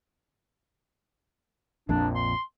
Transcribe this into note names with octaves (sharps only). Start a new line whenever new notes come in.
A#1 F2 A#2 D4
C6